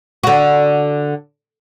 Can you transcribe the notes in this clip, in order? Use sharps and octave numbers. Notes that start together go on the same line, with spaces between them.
D3 F#4